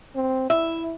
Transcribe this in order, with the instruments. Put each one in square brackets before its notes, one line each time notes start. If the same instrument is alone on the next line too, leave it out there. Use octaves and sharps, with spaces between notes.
[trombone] C4
[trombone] E4 [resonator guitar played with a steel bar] E5